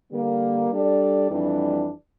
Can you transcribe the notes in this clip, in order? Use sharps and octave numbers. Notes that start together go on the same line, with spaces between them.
D3 G3 A#3
G3 D4 A4 D5
F2 E3 G3 D4